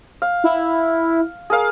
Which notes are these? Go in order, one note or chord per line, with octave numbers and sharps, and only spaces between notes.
F5
E4
G#4 A#4 F5